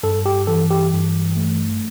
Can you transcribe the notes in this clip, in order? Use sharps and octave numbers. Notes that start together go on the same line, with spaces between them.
G2 A4
G4
E3 A4
G4
G2
A3